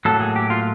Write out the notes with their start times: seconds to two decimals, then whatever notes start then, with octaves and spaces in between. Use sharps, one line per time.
0.05 A2 F#3 A#3 A4
0.20 G#4
0.36 G4
0.50 F4